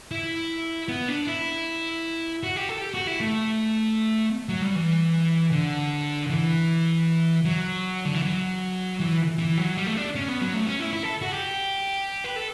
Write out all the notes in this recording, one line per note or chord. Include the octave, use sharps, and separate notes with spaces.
E4
B3
D4
E4
F#4
G4
A4
G4
F#4
E4
A3
F#3
G3
E3
D3
E3
F#3
D3
E3
F#3
E3
E3
F#3
G3
A3
D4
C#4
B3
F#3
A3
C#4
E4
E4
A4
F#4
G4
B4
A4